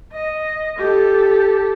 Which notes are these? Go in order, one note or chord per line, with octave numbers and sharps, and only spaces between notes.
D#5
G4 A4